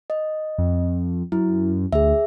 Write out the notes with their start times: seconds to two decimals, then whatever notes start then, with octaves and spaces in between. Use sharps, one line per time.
0.10 D#5
0.58 F2
1.32 F#2 E4
1.93 D2 G#4 E5